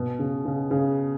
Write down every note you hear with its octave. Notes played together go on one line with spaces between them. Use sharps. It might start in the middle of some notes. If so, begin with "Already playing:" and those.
Already playing: B2
C#3
C#3
C#3